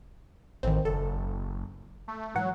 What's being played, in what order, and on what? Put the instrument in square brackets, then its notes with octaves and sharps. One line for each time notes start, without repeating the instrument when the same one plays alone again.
[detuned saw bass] A1 [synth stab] D#3 C4
[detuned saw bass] F#1 [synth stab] A4
[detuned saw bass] A3
[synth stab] G#2 E3 F#5 [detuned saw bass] F#3